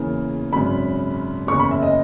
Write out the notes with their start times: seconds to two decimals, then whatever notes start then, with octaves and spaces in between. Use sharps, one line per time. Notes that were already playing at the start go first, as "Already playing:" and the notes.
Already playing: E2 C#3 E3 A#3
0.53 G#1 F#2 C#3 B5
1.47 F#1 E2 C#3 C#6
1.59 B5
1.71 E5
1.83 D#5